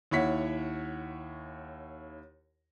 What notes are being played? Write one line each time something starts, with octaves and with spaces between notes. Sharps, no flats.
D#2 E4 C#5 F#5 B6